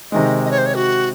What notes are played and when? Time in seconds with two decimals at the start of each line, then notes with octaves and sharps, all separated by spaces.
0.12 C3 D#3 G#3 D#5
0.44 D#5
0.51 C#5
0.58 C5
0.66 C#5
0.76 F#4